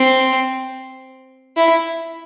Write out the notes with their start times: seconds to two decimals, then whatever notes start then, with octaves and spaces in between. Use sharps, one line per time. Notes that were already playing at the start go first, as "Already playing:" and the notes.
Already playing: C4
1.57 E4